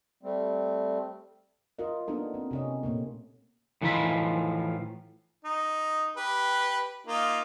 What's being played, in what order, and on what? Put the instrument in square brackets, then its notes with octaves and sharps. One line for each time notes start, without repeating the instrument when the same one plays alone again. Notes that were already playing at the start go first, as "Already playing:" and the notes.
[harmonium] G3 A3 C4
[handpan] F4 A#4 D#5
A#3 B3 D4 D#4 A4
C4
C3 C#4 D#5
A#2 A3 A#3
[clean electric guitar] A2 E3 F3 D#4 F4 B5
[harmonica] D#4
G4 B4
A#3 D#4 F4